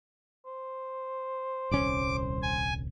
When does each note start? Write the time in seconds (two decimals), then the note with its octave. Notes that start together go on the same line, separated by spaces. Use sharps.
0.46 C5
1.71 D#1 C2 C#4 D6
2.42 G#5